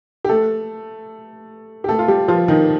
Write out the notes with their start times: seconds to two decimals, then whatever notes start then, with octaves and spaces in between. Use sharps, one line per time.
0.24 G4
0.29 A3 A4
1.84 G4
1.88 A3 A4
1.99 F4
2.08 G3 G4
2.28 F3 F4
2.48 D#3 D#4